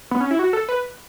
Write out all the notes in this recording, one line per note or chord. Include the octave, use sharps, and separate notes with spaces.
B3
C#4
E4
F#4
A4
B4